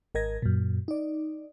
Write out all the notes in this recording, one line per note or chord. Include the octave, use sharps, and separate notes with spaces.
G#1 A#4 D#5 G#6 A#6
F#2 A#2
D#4 D5